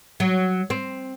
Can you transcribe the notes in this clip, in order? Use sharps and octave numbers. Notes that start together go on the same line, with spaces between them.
F#3
C4